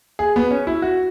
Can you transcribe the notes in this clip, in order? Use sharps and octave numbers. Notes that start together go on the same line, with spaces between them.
G#4
B3
C#4
E4
F#4